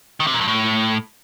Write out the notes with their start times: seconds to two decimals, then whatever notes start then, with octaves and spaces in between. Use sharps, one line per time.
0.20 D#3
0.27 C3
0.34 A#2
0.41 G2
0.48 A2